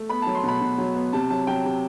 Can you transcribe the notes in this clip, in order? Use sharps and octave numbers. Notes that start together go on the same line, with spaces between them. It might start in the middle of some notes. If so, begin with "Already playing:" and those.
Already playing: A3
B3 B5
A5
F#3
C6
B2 B5
B2
F#3
B3
C3 A5
F#3 A5
F#3 G5
C3